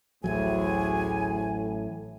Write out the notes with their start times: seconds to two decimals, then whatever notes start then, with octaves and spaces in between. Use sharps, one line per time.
0.24 A1 D2 A2 F#3 G#4 G#5